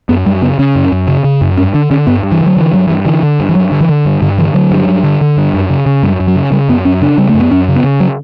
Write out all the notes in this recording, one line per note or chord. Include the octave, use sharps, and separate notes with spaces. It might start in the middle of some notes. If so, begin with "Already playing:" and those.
F#2 B3
F#2 G3
C#3 B3
C#3 C#4
F#2
F#2
C#3
C#3
F#2
G2 C#4
D3 D4
D3 C#4
G2 B3
G2
E3
D3
F#3
D3 E3
G2 F#3
E3
G2
D3 E3
D3
G2
E3
G2 F#3
D3
E3
D3
G2
G2 D3
D3 E3
D3 F#3
G2
G2
D3
D3
G2
F#2
C#3
C#3
F#2 G3
F#2
F#3
C#3
C#3 G3
F#2 B3
F#2 C#4
C#3 D4
C#3 G3
A3
F#2
B3
F#2 C#4
C#3
B3
C#3
F#3